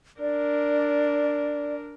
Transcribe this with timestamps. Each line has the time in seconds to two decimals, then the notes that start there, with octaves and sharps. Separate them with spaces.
0.20 D4 A#4 D5